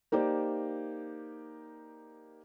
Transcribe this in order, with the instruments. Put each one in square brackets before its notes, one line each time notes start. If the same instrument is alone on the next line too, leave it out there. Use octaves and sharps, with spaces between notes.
[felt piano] A#3 D#4 G4 C5 D5